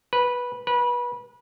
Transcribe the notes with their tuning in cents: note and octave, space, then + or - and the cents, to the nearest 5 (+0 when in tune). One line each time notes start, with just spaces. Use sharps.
B4 -10
B4 -25